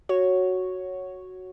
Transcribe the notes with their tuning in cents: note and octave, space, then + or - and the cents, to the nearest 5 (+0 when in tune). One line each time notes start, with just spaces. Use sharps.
F#4 +0 C#5 +0